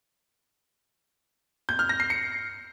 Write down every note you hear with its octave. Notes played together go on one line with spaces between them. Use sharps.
G6
F6
A#6
C7
C#7